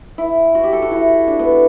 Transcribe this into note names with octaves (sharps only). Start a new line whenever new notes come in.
E4
F#4
G4
A4
F#4
E4
D4
B3